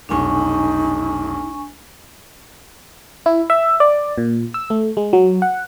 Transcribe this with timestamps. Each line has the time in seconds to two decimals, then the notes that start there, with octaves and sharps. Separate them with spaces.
0.09 F1 B1 D4 D#4 G#5 C#6
3.26 E4
3.50 E5
3.80 D5
4.18 A#2
4.54 E6
4.70 A3
4.97 G#3
5.13 F#3
5.42 F#5